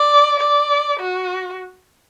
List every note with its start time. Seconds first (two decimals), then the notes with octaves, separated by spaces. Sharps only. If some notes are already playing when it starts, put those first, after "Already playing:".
Already playing: D5
0.40 D5
1.00 F#4